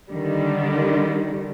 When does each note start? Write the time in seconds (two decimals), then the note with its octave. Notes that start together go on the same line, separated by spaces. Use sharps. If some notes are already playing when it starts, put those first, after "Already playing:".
0.10 D3 D#3 G3